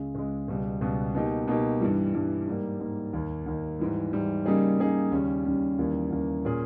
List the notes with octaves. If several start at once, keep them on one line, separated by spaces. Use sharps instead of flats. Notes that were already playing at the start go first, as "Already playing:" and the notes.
Already playing: C#2 C#3 G#3
C#2 C#3 G#3
C#2 B2 G3 B3
C#2 B2 G3 B3
B2 A#3 D#4 G4
B2 A#3 D#4 G4
G2 E3 G3
G2 E3 G3
G#2 G3 A#3
G#2 G3 A#3
D#2 D#3 A#3
D#2 D#3 A#3
G#2 E3 G3
G#2 E3 G3
C#3 G3 A#3 D#4 G#4
C#3 G3 A#3 D#4 G#4
D#2 C#3 G3 C#4
D#2 C#3 G3 C#4
D#2 C#3 E3 G3 A#3
D#2 C#3 E3 G3 A#3
A#2 A#3 C#4 G#4